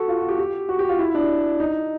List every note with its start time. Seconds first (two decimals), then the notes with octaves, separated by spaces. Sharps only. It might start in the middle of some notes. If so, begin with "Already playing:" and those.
Already playing: F#4 A4
0.08 F4
0.18 F#4
0.29 G4
0.39 G4
0.69 F#4
0.79 G4
0.89 F4
0.99 E4
1.15 D4
1.60 D#4